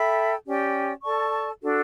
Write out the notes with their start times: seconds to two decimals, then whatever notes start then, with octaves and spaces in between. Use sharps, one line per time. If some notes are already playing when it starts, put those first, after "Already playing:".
Already playing: A4 E5 G5 B5
0.46 C#4 G4 D5 G5
1.03 A4 D5 A5 C#6
1.61 D4 F#4 A4